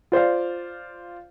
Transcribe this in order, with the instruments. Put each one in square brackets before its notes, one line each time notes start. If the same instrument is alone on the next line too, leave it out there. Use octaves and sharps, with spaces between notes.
[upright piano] F4 C5 D5 F5